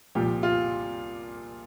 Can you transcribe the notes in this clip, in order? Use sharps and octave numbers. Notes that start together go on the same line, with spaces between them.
C2 A#2 F3 G4
F4